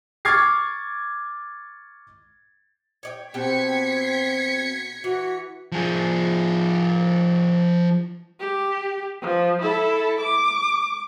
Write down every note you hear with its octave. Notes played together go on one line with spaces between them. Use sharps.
C#6 D6 F6 G#6 A6 C7
C#5 D5 G5
B2 C4 G4 G5 G#6 B6 C#7
E3 F#4
F3 G#4
G4
F3
E4 A4
D6